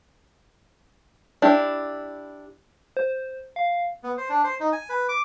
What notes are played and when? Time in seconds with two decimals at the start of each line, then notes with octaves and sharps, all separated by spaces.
1.42 D4 E4 G4
2.97 C5
3.56 F5
4.03 B3
4.18 C5
4.29 D4
4.44 C5
4.60 D#4
4.72 G#5
4.89 B4
5.09 D6